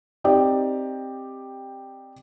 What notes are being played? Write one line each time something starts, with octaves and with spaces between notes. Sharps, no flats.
C4 D#4 G4 D5